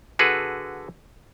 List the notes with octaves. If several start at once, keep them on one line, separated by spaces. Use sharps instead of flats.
D3 F#4 G#4 A4 B4